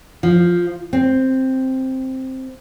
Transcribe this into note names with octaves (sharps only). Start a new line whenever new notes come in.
F3
C4